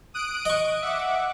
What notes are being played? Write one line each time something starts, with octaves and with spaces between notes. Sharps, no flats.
D#6 F#6 D7
D#5 C#6
E5 F#5 D6